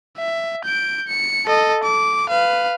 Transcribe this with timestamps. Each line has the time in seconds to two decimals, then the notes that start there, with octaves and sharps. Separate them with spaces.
0.18 E5
0.64 G6 D7
1.08 C#7
1.46 A4 D#5
1.84 D6
2.29 B4 F5